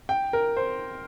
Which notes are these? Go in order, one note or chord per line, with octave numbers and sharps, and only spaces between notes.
G5
A#4
C5